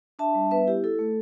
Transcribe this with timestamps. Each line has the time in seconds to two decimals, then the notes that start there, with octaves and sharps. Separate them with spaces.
0.19 D4 E5 A5
0.35 G3
0.51 B3 B4 E5
0.67 E4 G4
0.84 E4 A4
0.99 A3